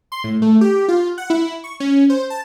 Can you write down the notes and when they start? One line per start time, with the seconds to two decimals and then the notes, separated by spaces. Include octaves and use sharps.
0.12 C6
0.24 A2
0.42 A3
0.61 G4
0.88 F4
1.18 F#5
1.30 E4
1.64 C#6
1.80 C#4
2.10 C5
2.30 A5